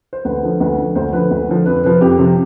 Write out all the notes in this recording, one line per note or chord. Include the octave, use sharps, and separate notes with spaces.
C5
D2 B4
D3 F3
D2 B4
D3 F3
D2 C5
D3 F3 B4
D2
D3 F3
F2 B4
C3 F3 B4
F2 G4
C3 F3